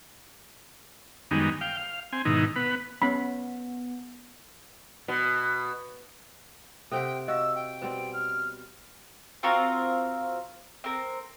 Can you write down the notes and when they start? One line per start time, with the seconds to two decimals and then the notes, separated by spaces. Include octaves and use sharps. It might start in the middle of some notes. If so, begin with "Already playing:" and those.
1.31 F#2 D#3 G3 G#3 B3 D#4
1.61 F5 G5
1.77 F5
2.12 C4 G#5
2.25 G#2 B2 D#3 D#4 E4
2.56 B3 B4
3.02 B3 C#4 B5
5.08 B2
6.92 C3 C4 G4 A4 C5 F#5 G5
7.28 F#4 D#5 F5 E6
7.55 G5
7.82 B2 G3 C4 B4
8.13 F6
9.43 C4 F4 F#4 A#4
10.84 C4 A#4